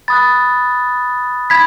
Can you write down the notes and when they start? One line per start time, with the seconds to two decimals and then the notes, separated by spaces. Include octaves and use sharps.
0.08 B5 D#6 F#6 A6
1.50 B5 G#6 B6